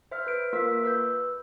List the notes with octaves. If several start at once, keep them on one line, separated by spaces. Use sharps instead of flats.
C5 E5 F6
B4 D7
A#3 F4 A#4 E5 E6 B6
B4 E6 G6